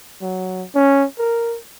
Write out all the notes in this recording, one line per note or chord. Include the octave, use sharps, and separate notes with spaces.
F#3
C#4
A#4